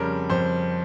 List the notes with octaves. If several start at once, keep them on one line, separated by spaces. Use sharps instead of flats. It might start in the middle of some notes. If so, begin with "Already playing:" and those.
Already playing: F2 C#3 G3 A#4
F2 C5